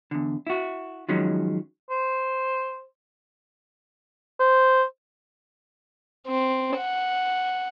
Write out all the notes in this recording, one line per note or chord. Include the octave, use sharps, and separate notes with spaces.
E2 D3
E4 F#4
D#3 F3 F#3 G#3 C#4
C5
C5
C4
F#5